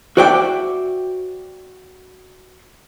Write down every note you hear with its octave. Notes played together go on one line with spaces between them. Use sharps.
F#4 C5 D5 E5 G5